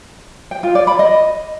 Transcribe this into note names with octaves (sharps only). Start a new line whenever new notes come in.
G5
F4
D5
B5
D#5